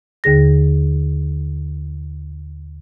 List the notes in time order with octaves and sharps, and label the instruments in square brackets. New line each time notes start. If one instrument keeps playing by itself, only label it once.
[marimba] D#2 D3 G#4 A#6